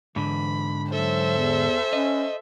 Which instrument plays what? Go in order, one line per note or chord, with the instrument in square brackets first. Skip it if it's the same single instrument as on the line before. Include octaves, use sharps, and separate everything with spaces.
[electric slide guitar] G#2 D3 [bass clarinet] E3 [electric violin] B5
[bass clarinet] F#3 [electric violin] A4 E5 [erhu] C5
[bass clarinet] E2
[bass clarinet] C#4 [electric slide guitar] D#5